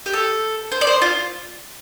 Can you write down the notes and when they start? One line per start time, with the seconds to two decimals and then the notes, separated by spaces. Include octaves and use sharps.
0.06 G4
0.13 A4
0.72 C5
0.81 D5
0.87 C5
1.02 F4